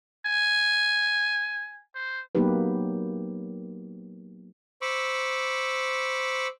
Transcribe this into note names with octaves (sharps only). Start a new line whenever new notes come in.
G#5
C5
F#3 A#3 B3 D#4 G4 B4
C5 B5 C#6 D6 E6